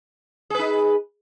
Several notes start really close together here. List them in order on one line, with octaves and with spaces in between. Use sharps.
G#4 B4 D#4